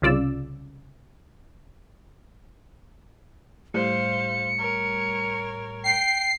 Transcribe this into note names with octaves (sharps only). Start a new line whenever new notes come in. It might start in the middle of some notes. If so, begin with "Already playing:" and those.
C2 C#3 F4 D5 E6
A2 G3 C5 F5 C#7
A#4 C#5
G5 C7